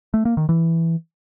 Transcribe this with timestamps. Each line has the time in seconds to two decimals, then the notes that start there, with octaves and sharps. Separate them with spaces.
0.14 A3
0.25 A#3
0.37 D#3
0.49 E3